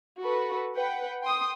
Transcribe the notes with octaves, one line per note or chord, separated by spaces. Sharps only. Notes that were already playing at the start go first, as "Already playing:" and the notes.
F#4 A4 B4
B4 F#5 G5
G5 C6 D#6